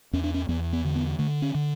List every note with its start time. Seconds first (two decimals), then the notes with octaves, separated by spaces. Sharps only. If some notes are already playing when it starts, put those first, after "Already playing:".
0.13 E2 C#4
0.24 D4
0.34 C#4
0.49 E2 B3
0.73 B3
0.84 D3
0.96 B3
1.18 D3 A3
1.42 C#4
1.55 D3